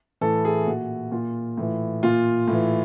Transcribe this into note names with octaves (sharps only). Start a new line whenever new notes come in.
A2 E3 A4
G#4
A#2 F#4
A#2 F4
A2 E3
A#2 F4
A2 E3